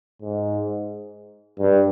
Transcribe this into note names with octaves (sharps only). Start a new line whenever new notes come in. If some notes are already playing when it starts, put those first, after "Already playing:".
G#2
G2